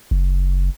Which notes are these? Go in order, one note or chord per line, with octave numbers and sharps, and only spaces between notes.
F#1